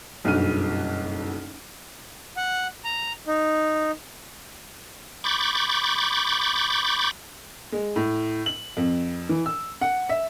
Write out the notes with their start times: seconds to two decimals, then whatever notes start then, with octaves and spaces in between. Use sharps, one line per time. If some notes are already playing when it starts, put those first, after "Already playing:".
0.24 F#1 B1 G2 F#4 F6 D#7
2.37 F#5
2.84 A#5
3.27 D#4
5.24 B5 C#6 D6 G6 A6
7.72 G#3
7.96 A2
8.46 F#7
8.77 F2
9.29 E3
9.46 E6
9.81 F#5
10.09 E5